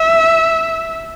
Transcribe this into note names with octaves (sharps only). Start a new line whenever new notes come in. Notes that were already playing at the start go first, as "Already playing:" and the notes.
Already playing: E5